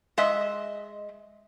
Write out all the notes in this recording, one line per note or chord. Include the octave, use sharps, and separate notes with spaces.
G#3 D#5 E5